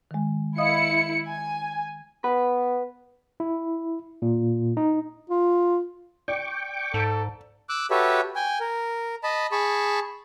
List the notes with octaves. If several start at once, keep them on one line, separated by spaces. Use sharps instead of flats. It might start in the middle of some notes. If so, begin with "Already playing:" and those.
D#3 G#3
E4 D#5 F5 D#6 C#7
G#5
B3 B4
E4
A#2
D#4
F4
D5 G5 C#6 D6
G#2 A4
D6 E6 F#6
F#4 G4 A4 B4 C#5 E5
G5 G#5
A#4
D#5 A5 B5
G#4 A5 B5 C#6